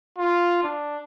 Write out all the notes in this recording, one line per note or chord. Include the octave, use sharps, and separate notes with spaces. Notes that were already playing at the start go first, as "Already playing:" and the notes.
F4
D4